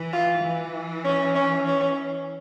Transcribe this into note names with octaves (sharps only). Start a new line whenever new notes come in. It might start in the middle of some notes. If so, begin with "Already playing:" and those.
Already playing: E3
F4
E3
C#4
C#4
C#4